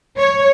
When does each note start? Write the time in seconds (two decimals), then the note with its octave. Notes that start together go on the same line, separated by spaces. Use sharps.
0.18 C#5